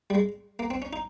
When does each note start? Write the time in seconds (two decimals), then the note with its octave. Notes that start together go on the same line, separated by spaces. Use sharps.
0.10 G3
0.15 G#3
0.59 A#3
0.70 C4
0.82 C#4
0.93 D#4